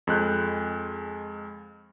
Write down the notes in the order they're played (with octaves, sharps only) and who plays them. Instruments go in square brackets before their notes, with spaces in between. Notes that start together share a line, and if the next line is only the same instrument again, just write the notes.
[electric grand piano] F2 G#3 F#6 G6